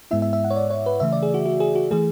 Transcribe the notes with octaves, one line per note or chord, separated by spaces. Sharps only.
G#2 G#3 B3 E4 E5
E5
E5
F#5
C#5
D5
C#5
B4
C#3 E3 A3 E5
D5
G#4
F#4
F#4
G#4
F#4
E3 A3 G#4